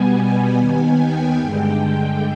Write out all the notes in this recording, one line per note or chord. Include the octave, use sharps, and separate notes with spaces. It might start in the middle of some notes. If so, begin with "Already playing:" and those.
Already playing: B2 G3 B3 G#5
G#5
D#2 D#3 B3 G#5
G5
G2 D3 G#3